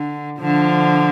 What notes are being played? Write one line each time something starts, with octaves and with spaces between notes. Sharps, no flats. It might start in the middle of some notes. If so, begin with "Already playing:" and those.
Already playing: D3
D3 F3